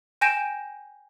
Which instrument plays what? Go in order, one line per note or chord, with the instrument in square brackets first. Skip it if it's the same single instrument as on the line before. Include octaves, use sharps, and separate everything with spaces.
[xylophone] G5 G#5 G6 A#6 D7 E7